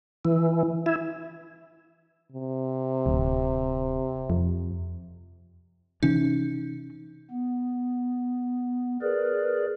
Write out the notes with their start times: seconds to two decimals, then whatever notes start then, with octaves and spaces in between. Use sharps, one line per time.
0.25 E3
0.86 E4
2.32 C3
3.06 D1
4.30 F2
6.03 C3 E3 C#4 D#4
7.31 B3
9.02 G#4 A#4 B4 D5